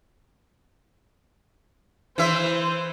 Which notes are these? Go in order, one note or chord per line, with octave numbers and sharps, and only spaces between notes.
E3 C5 E5